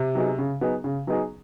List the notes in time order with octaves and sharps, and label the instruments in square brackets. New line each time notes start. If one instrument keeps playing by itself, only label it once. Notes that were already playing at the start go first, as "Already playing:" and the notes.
Already playing: [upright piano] C3
[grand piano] F#3 B3 D#4 G#4
C#3
F#3 B3 D#4 G#4
C#3
F#3 B3 D#4 G#4